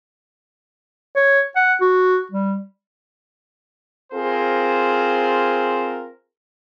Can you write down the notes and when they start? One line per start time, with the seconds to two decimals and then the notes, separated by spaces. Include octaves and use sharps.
1.16 C#5
1.56 F#5
1.81 F#4
2.32 G3
4.13 C4 F4 G#4 A#4 C5